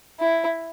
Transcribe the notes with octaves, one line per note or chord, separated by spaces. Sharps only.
E4